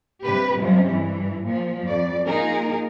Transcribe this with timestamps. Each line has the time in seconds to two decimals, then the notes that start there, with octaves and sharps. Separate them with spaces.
0.23 G2 C3 G4 B4
0.58 F#2 C3 F3 G3 G#3 C#4
0.90 G2 E3
1.45 A#2 F3
1.86 F2 D5
2.26 A#3 D#4 F4 G#4 A#4